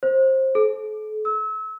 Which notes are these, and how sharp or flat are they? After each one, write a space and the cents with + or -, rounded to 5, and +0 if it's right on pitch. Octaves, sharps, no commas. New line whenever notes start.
C5 +20
A4 -40
E6 -30